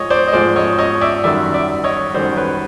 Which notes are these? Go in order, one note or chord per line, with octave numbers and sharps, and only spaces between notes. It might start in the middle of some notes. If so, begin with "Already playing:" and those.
Already playing: G#2 F3 G#3 C#5 D#5
C5 D5
D#5
G#2 F3 G#3 C5 D5
C#5 D#5
C#5 D#5
D5 E5
F#2 D#3 G3 D5 E5
D5 E5
C#5 D#5
F#2 D#3 G3 C5 D5
B4 C#5